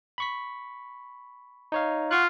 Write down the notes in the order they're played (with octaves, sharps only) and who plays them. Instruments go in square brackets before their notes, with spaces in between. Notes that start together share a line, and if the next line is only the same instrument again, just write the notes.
[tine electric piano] B5 C#6 B6
D#4 C#5 F5
[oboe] F4 [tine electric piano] F#5 C#6 F#6